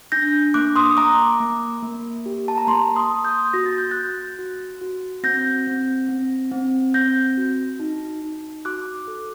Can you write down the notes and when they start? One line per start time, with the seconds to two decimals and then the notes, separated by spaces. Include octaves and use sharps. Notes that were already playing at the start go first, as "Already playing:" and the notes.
0.12 D4 G6 A#6
0.54 A#3 D6 F#6
0.76 C6 D#6
0.97 A#3 A#5 D6
1.40 A#3
1.82 A#3
2.26 G4
2.48 A5
2.58 A#5
2.67 A#3 A5 C6
2.96 C6 D#6
3.10 A#3
3.24 D#6 G6
3.53 F#4 A#6
3.66 A6
3.78 G6
3.91 F#4 F#6 A6
4.39 F#4
4.81 F#4
5.23 C4 G6 A#6
5.67 C4
6.09 C4
6.52 C4
6.94 C4 G6 A#6
7.37 F#4
7.79 D#4
8.22 D#4
8.65 F#4 D6 F#6
9.08 A4